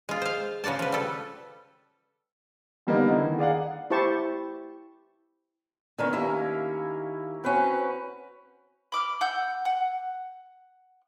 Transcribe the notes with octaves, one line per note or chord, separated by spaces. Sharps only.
G#3 F4
C5 F5
C#3 F3 F#4 D5 A5
F3 B4
G3 A4
D3 G3 A#3 B3 D4 D#4
D3 E4
D#3
G#4 D5 F5 F#5
E4 G4 C5 A5 C#6
D3 D#3 B3 C#4 A#4 G#5
D#2 A#3 E4
C4 C#4 F#4 B4 G5
B5 D6 E6 F6
F#5 E6 G6
F#5